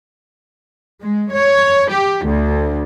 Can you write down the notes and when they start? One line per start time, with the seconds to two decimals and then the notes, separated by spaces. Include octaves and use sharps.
1.02 G#3
1.32 C#5
1.91 G4
2.26 D2